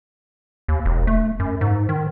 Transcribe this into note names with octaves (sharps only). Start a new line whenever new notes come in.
D#2
E1
A3
F#2
G#2
D#3